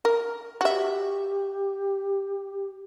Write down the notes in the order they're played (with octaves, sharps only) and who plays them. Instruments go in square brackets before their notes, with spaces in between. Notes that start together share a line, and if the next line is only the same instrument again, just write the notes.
[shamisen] A#4
[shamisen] F#4 E5 [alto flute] G4